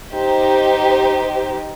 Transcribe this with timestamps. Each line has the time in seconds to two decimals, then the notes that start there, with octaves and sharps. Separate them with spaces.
0.14 D#4 G4 C5